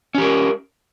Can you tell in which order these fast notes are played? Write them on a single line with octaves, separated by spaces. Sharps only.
C#4 G4 A#4